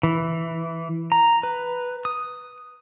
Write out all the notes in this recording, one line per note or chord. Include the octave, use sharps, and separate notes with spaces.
E3
A#5
B4
D#6